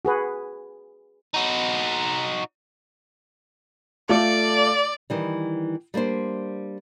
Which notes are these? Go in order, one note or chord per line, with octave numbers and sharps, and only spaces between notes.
F#4 G#4 B4
D#4 F#4
A3 F4 A4 D5
D#3 E3 G3
G3 A#3 D4 C5